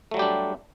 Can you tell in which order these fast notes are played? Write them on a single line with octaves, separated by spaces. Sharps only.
A3 F#3 G3 G4 D4